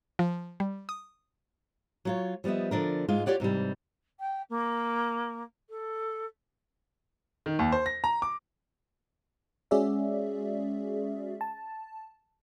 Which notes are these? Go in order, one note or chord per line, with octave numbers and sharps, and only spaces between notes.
F3
G3
D#6
F#3 F4 C#5
F3 G3 B3 D#5 E5
D3 F3 D4 A#4
G#2 G#3 F4
F4 G4 C#5 D5 F#5
G#2 C3 E3 G3
G5
A#3
A4
D#3
D#2
C5
A#6
A#5
D6
G#3 C#4 F#4 G#4 D5 E5
A5